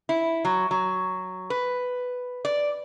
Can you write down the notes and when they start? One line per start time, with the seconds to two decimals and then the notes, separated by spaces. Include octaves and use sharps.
0.09 E4
0.45 F#3
0.71 F#3
1.50 B4
2.45 D5